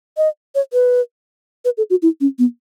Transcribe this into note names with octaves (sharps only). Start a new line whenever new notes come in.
D#5
C#5
B4
B4
A4
F#4
E4
C#4
B3